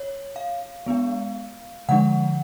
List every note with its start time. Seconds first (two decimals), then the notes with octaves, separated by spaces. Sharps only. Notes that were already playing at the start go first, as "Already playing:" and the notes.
Already playing: C#5
0.36 F5
0.86 G#3 B3 D4
1.89 D3 F3 G#3 D4 F#5